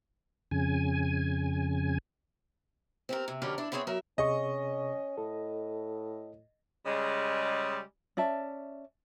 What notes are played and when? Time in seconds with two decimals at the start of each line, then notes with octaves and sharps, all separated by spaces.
0.51 F2 C#3 G#5
3.09 C4 G4 A#4
3.28 C3
3.42 F2 D3 C#4 G4 A#4 B4
3.58 D4 E4
3.72 B3 C4 E4 G#4 C#5
3.87 F#3 A#4 E5
4.18 C3 C#4 G#4 D#5 C#6
5.17 A2 A4
6.86 C#3 G3 G#3
8.17 C#4 D5 E5 A5